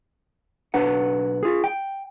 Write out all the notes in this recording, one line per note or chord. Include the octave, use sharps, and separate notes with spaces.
B1 D4 B4 F#5
F4 G#4
G5